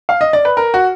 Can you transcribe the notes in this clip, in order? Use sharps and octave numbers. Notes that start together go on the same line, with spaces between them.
F5
D#5
D5
B4
A#4
F#4